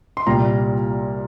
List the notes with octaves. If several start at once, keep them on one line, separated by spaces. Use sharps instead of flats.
C6
C2 A#2 G3 A#5